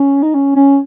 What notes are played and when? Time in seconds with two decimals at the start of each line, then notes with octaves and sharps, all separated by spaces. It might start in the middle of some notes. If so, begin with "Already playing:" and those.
Already playing: C#4
0.23 D#4
0.35 C#4
0.56 C#4